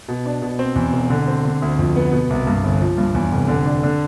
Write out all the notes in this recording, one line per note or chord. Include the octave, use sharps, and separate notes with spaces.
B2
D4
B2
C4
E2
E1
D3
C4
D3
D2
F2
B3
B2
C2
G2
G1
F3
G2
E2
F1
D3
D4
D3